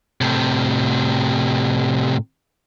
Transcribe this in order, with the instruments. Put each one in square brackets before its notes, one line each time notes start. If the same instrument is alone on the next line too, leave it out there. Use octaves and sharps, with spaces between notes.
[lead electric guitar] A2 C3